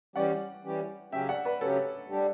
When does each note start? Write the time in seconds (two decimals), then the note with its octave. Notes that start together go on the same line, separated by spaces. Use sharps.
0.16 E3 G3 C#4 G4 D5 F#5
0.64 E3 G3 C#4 G4
1.12 C#3 F#3 C#4 G4 E5 G5
1.29 D5 F#5
1.45 B4 D5
1.61 C#3 F#3 C#4 G4 A4 C#5
2.10 G3 D4 G4